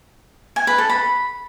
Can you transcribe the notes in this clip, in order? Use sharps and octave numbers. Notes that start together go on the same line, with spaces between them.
G#5
B4
A4
B5